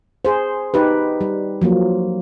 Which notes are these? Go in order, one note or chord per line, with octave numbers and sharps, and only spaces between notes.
G#4 C5
D#4 G4 B4
G3
F3 F#3 A#3